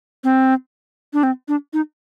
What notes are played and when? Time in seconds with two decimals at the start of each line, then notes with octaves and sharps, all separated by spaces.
0.24 C4
1.13 D4
1.23 C4
1.48 D4
1.73 D#4